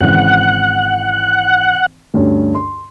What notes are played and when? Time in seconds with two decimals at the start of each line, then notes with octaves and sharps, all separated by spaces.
0.01 G#1 C#3 E3 F#5
2.14 D2 G2 C#4
2.55 C6